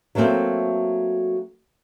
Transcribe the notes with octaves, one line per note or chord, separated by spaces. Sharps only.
F#3 A3 A#3 C4